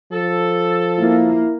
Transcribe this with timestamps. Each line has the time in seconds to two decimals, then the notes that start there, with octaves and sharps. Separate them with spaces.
0.13 F3 A4
0.99 A#3 E4